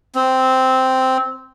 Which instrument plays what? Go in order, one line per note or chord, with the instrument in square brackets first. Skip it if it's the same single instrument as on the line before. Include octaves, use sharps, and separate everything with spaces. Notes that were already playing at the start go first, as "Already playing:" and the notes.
[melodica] C4